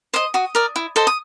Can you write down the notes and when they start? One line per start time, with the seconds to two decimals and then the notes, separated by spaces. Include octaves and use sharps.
0.14 C5 D#5 D#6
0.34 F#4 D#6
0.55 A#4 D5
0.76 E4
0.96 A4 C5 D#5
1.07 D#6